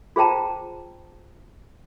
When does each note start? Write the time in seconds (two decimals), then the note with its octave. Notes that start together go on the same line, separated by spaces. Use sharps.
0.16 F4 G#4 C5 G5 A5 A#5